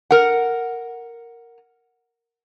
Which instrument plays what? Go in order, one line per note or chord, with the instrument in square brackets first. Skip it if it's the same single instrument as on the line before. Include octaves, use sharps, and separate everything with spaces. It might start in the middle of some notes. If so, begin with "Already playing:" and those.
[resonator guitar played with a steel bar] A#4 F#5